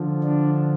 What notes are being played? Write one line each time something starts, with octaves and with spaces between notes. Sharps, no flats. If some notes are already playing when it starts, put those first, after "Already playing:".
Already playing: D3 F3
D4